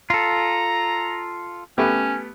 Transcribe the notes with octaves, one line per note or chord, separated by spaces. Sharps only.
F4 A4 A#5
A3 B3 C#4 G4